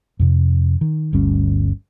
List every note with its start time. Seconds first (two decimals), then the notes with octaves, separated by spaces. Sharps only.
0.19 F2 C3
0.81 D#3
1.13 G1 D2 G3 C#4